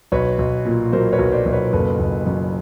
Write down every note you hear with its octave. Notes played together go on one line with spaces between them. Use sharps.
B1 B4 C#5
B1
A#2
F#3 A#4 C5
B4 C#5
B1
C5 D5
B1
B4 C#5
F#1 A4 B4
F#1
F#2